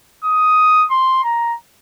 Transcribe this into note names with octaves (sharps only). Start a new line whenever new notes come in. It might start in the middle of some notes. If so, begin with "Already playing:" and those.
D#6
C6
A#5